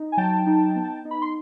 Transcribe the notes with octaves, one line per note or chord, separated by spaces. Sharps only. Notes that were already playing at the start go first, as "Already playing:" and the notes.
Already playing: D#4
G#5
F#3 G5 A5
D#4
B3
D#4
B5
C6